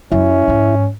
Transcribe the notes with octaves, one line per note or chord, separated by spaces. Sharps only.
F#2 F#3 C#4 E4
F2 G#2